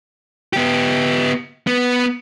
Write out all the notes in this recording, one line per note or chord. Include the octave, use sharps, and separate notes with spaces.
B3 G4
B3